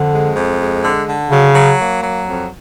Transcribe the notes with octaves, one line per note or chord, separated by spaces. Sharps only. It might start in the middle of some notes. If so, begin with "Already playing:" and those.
Already playing: F2 D3
G#3
F2
G#3
D3
D3
C#3 F#3
F#3
A#3
F#3
F2